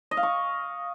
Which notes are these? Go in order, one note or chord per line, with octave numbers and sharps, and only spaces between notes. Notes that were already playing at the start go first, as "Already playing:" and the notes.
D#5
F5
C#6